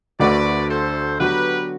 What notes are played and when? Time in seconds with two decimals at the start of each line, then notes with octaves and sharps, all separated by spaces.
0.20 D2 D3 A3 D4 F#4 B4 D5
0.69 A4 C5
1.19 D3 F#3 B3 F#4 G4 B4